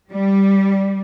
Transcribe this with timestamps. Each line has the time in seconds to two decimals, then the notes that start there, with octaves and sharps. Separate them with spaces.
0.11 G3